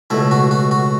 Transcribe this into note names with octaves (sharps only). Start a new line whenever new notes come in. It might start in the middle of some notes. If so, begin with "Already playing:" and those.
C#2 B2 A3 E4
F#4
F#4
F#4